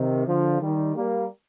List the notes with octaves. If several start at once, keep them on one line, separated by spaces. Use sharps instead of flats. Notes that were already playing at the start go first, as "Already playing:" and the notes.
Already playing: C3 D#3
D3 F3
D#3 G3
G3 A#3